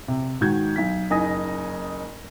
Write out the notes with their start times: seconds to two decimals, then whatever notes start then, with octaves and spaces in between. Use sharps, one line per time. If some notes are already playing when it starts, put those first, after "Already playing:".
0.08 C3
0.41 G#2 D#3 F#4 G6 G#6
0.76 B1 B6
1.10 F#1 D#4 G#5 D#6 A#6